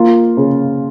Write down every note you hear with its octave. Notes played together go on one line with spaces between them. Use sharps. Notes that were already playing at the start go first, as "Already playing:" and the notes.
Already playing: A#3 F4
C#3